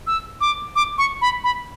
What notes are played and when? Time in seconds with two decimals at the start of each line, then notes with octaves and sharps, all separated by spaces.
0.07 E6
0.41 D6
0.76 D6
0.98 C#6
1.22 B5
1.44 B5